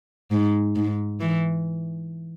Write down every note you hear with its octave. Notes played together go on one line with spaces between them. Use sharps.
G#2
G#2
E3